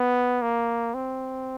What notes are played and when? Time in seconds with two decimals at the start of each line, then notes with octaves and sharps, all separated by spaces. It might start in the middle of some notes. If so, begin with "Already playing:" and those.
Already playing: B3
0.42 A#3
0.94 C4